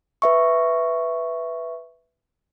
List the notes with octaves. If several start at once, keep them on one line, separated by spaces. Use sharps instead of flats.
B4 E5 C#6